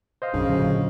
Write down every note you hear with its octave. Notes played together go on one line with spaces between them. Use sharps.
C5 D#5 F5
B1 F#2 C#3 D4
A#2 D3 F#3